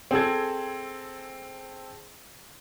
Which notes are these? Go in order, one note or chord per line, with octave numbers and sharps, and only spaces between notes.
C4 G#4 A4 G#6